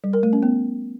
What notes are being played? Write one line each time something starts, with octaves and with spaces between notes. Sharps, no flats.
G3
A#4
A3
C#4
B3